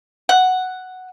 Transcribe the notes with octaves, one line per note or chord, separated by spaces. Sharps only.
F#5